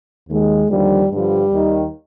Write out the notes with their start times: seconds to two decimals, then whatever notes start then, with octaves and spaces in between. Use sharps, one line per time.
0.29 D#2 D#3 G#3
0.69 D#2 D3 F3 G3
1.11 G2 D3 F3 G3
1.51 D#2 D#3